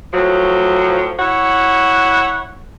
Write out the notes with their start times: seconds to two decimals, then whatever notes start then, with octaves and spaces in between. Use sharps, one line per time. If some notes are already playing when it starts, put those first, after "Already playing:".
0.13 A2 F3 F#3
1.19 E4 C#5 F#5